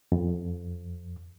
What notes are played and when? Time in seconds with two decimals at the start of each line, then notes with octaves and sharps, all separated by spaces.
0.12 F2